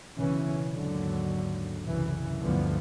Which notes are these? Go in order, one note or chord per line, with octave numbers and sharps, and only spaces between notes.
B1 C#3 E3 C#4
D#2 G#2 D3 F#3
C2 F#2 C#3 E3
D2 G2 D3 E3 F3 B3